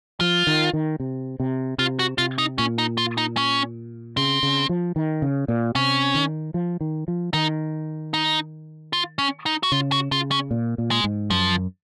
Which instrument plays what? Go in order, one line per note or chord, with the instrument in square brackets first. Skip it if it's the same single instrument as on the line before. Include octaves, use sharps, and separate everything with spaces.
[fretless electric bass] F3 [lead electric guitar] F4
[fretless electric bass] D#3
D#3
C3
C3
[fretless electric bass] C3 [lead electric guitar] F4
[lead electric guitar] F#4
[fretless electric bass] C3 [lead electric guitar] F4
[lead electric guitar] D#4
[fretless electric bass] A#2 [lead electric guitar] C#4
[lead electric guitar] D#4
F4
D#4
C#4
[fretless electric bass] C#3 [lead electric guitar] C4
[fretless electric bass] C#3
F3
D#3
C#3
A#2
[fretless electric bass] C3 [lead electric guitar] C#4
[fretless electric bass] D#3
F3
D#3
F3
[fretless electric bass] D#3 [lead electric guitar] D#4
[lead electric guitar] D#4
F4
C#4
D#4
F#4
[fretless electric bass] C#3 [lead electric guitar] F4
[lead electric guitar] F#4
[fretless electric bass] C#3 [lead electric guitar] F4
[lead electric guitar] C#4
[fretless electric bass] A#2
A#2
[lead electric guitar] G#3
[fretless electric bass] G#2
[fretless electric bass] F#2 [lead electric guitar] F3